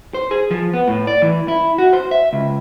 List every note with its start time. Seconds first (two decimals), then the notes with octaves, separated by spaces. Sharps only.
0.14 C5
0.31 G#4
0.51 F3
0.74 B3
0.88 A2
1.07 D5
1.22 E3
1.48 E4
1.78 F#4
1.93 C5
2.11 E5
2.33 C#2